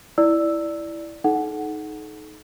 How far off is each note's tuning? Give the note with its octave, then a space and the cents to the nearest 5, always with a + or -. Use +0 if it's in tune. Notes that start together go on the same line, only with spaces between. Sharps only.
E4 +0 D5 +0 E6 +0
D#4 +0 A4 -40 F#5 +0